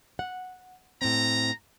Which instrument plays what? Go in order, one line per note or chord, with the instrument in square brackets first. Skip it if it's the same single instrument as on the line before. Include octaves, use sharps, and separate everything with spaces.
[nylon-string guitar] F#5
[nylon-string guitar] A2 C4 [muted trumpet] A#5